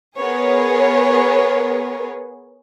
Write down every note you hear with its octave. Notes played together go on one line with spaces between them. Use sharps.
B3 G#4 A#4 B4 C#5